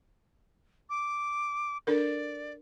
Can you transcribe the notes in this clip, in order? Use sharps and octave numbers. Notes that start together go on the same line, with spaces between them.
D6
D4 A4 A#4 D5